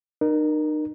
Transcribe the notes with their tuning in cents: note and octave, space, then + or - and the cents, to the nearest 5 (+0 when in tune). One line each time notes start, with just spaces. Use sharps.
D#4 -40 A#4 +10